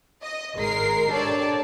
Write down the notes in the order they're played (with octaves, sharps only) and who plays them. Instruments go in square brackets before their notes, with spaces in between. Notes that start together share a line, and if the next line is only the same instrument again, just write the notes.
[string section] D#5
G#1 G#3 A#4 C7
D4 G4 A4 C#5 D5 A5